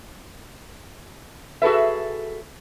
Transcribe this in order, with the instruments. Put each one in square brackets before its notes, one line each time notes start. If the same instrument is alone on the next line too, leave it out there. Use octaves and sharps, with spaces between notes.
[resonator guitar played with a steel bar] F#4 G#4 A4 B4 E5